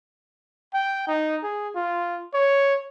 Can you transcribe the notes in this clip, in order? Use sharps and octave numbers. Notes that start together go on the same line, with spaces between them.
G5
D#4
G#4
F4
C#5